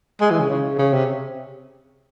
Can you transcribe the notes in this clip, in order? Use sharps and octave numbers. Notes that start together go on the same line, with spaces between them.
G#3
E3
C#3
C#3
C#3
C3